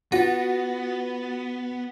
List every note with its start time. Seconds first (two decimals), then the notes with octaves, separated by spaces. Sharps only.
0.12 B3 F4 F#4 A#6